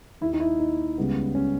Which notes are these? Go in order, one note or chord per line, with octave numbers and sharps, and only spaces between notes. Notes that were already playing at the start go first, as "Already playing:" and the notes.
D#2 D#3 A#3 E4
D#4
E4
D#4
C#2 C#3 G3 B3
C#4